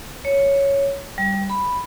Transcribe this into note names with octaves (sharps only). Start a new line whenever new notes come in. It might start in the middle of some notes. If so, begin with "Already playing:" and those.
C#5
G3
B5